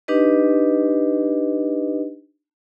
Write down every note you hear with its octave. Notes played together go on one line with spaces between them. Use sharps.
D4 D#4 G4 B4 D#5